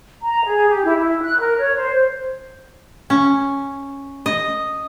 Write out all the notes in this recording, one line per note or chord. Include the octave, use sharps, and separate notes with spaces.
A#5
G#4
G4
E4
E4
F#6
A#4
C#5
C5
C#4
D#5